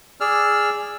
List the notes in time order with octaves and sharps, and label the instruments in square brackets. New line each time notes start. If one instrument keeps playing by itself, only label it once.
[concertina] G#4 D5 E6 F6